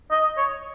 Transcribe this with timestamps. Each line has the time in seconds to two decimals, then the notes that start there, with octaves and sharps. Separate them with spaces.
0.11 D#5
0.37 C#5